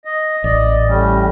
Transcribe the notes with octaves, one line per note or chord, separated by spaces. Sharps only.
D#5
A1 D5 D#5
A2 G3 C#4